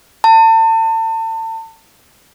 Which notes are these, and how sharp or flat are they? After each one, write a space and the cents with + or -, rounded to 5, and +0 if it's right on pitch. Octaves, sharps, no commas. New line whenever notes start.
A5 +35